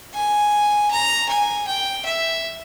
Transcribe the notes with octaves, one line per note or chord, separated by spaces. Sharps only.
G#5
A#5
G#5
G5
E5